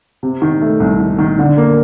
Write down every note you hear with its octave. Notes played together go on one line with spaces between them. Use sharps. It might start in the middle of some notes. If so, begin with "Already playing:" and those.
C3
D#3
A3
C2
D#3
D#3
D3
A#3